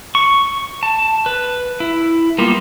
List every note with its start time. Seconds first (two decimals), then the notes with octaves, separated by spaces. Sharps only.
0.15 C#6
0.83 A5
1.26 B4
1.80 E4
2.38 G3 A#3 B3 F4 G4